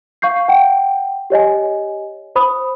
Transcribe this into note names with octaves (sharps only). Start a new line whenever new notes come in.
F5 C#6 G6 C7
F#5 G5
G4 C#5 D#5 G#5
C5 B5 D#6